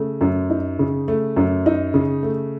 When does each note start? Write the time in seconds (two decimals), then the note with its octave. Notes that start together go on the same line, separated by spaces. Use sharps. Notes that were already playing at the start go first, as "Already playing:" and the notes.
Already playing: C#3 A3
0.21 F#2
0.50 D#4
0.79 C#3
1.08 A3
1.36 F#2
1.66 D#4
1.94 C#3
2.23 A3